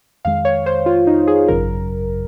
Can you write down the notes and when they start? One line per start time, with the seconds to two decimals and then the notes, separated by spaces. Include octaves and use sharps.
0.25 F2 D#3 G#3 F5
0.45 C#5
0.66 C5
0.86 F4
1.07 D#4
1.27 G#4
1.48 G#1 F#2 C#3 F#3 A#4